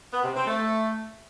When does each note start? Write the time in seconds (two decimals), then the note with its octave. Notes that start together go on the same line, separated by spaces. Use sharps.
0.11 B3
0.23 C3
0.35 C4
0.46 A3